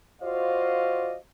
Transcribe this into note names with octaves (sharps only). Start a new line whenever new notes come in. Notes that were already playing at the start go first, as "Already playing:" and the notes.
F4 F#4 C5 D5 D#5 F5